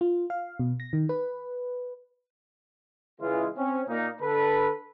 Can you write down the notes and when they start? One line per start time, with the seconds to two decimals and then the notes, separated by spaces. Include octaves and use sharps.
0.01 F4
0.30 F5
0.59 B2
0.80 A#6
0.93 D#3
1.09 B4
3.21 C#3 E3 G#3 F4
3.57 C4 C#4
3.89 A#2 A#3 D#4
4.21 D3 A4 B4